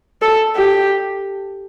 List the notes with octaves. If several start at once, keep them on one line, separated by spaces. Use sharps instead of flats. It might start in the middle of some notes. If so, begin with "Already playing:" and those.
A4
G4